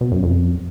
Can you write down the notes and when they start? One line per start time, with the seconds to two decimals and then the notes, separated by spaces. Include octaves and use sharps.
0.01 B2
0.12 F#2
0.23 F2